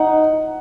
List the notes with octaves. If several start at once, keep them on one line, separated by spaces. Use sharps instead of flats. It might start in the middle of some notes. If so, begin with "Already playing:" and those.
Already playing: D#4 F#5